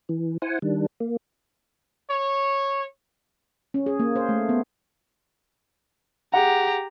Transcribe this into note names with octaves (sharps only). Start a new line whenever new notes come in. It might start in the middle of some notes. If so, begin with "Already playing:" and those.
E3
E4 C5 F#5 G#5
D#3 G3 D4
A#3
C#5
C#4
G#4
A#3
C5
A3
B3
G4 G#4 F#5 A#5